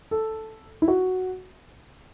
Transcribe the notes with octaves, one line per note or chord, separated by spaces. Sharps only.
A4
E4
F#4